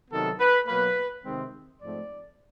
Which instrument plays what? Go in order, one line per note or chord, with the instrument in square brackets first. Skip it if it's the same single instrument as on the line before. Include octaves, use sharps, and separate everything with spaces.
[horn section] C3 D#3 F#3 B3 A4
B4
B2 F#3 A#3 B4
C3 D#3 G#3 C4
G#2 F3 A3 C4 D5